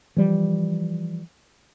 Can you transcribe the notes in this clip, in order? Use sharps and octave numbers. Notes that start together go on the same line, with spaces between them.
E3 F3 G3